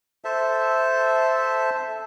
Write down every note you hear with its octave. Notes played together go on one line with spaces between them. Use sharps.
A4 C5 E5 A5